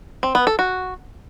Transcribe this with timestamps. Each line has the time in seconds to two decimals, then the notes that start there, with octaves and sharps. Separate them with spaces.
0.23 C4
0.35 B3
0.47 A4
0.59 F#4